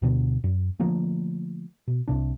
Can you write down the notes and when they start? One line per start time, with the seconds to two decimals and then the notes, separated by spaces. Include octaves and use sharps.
0.02 D2 B2 D3
0.44 F#2
0.80 D3 F3 A3 A#3
1.88 B2
2.08 C2 C3 D4